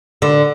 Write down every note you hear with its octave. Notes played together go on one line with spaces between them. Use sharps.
D3